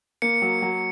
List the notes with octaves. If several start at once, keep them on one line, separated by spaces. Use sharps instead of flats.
A#3 C#7
F#3
F#3